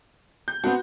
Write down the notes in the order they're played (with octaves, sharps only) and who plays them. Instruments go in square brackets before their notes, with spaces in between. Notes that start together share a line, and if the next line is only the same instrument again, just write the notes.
[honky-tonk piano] G6
[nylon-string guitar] B3 C4 D4 [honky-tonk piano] F#4